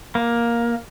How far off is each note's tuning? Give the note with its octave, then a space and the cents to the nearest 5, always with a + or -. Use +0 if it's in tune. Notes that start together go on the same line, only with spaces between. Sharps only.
A#3 +10